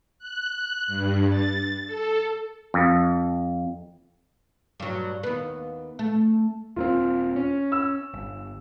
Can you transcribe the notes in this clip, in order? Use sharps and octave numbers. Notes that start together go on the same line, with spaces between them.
F#6
G2
A6
A4
F2
G2 F#3
D#2 B3
A3
D#1 A#3 C4 F4
C#4
E6
G1